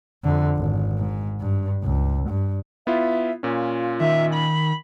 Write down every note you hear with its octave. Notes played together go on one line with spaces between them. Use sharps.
F2 D3
G#1
G#2
G2
C#2
G2
B3 E4 F4 E5
A#2 C#4 F4
D#3 E5
B5